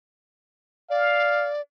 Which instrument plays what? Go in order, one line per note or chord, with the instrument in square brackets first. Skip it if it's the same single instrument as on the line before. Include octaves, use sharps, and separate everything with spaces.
[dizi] D5 [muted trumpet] F5